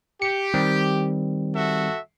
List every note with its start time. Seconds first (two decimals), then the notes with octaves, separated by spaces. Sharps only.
0.22 G4 C#7
0.54 D#3 G3 C4
1.55 F#4 A4 E5